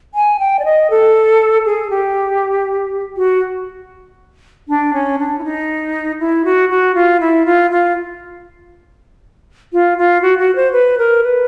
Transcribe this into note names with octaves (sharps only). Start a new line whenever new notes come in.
G#5
G5
D5
D#5
A4
G#4
G4
F#4
D4
C#4
D4
E4
D#4
E4
F#4
F#4
F4
E4
F4
F4
F4
F4
F#4
F#4
C5
B4
A#4
B4